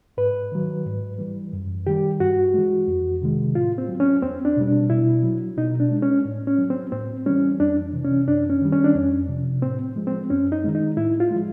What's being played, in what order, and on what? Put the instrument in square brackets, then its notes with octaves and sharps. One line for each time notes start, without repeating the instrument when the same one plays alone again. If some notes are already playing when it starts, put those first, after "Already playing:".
[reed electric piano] G#2 B4
D#3 F#3
G#2
E3 G3
F#2
D#3 G3 G4
G2 F#4
E3 G#3
F2
C3 D#3 G#3
A2 F4
C4
F#3
C#4
E2 C4
D4
B2 G3
D4
B2 E4
F#3
B2 D#4
D4
G#3
C#4
A2
C#4
F#3
C4
A2 C4
E3 G3 C#4
F2 D4
C3 E3
C#4
F#2 D4
C#4
D#3 G3
C#4
D4
F2 C#4
C3 F3
A2 C4
F3 G#3
C4
F#2 C#4
D#4
D#3 G#3
D#4
A2 E4
F4
F3 G#3